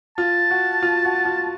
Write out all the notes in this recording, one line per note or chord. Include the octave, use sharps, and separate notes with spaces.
F4 A5
F#4
F4
F#4
F4